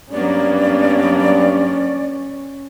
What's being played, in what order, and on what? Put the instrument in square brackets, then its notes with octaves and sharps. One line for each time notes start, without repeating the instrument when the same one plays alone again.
[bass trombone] G2 [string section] F#3 A#3 B3 [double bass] C#4 [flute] D5